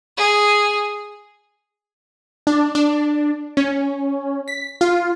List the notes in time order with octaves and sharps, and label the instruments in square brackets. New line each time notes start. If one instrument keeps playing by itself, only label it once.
[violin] G#4
[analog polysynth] D4
D4
C#4
B6
F4